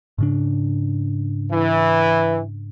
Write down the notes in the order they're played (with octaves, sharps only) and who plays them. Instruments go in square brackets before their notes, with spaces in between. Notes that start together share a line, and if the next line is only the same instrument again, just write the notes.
[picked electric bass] G#2 C#3 D4
[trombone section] E3